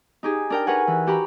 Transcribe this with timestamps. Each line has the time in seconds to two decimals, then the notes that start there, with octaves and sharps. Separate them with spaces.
0.23 D#4 G4 G#4
0.50 D4 A#4 G5
0.67 A#4 B4 C#5 F#5 G#5
0.87 E3
1.07 F#4 G4 A#5 B5